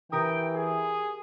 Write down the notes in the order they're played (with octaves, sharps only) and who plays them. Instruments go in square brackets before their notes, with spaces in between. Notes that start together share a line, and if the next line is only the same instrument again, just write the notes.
[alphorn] E3 [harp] G4 A#4 D#6 [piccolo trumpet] G5
[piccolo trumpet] G#4